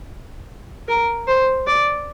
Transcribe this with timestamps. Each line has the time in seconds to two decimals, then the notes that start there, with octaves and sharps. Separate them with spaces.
0.88 A#4
1.28 C5
1.67 D5